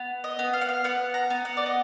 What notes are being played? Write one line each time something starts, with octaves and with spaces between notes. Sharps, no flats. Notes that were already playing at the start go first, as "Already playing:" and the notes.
Already playing: B3
D#5
B3
F5
F#5
F5
B3 F#5
A#5
B3
F#5
D5
D#5